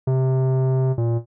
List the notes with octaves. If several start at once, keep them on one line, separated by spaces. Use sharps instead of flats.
C3
A#2